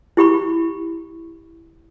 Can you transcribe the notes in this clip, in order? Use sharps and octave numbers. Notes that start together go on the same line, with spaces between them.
E4 G4 B5 C#6